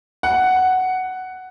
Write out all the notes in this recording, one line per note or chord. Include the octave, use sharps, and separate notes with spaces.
F#5